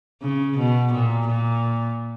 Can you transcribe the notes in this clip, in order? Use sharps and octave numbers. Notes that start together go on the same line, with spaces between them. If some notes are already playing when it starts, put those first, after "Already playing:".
C#3
B2
A#2
A#2